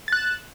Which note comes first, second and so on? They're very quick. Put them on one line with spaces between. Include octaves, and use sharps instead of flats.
A6 F#6 E7